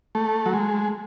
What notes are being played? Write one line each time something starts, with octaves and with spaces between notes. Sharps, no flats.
A3
F#3
G#3